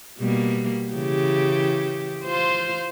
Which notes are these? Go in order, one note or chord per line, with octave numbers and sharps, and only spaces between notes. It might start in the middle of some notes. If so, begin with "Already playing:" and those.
B2 G3 A#3
C#3 E3 G4
F4 C5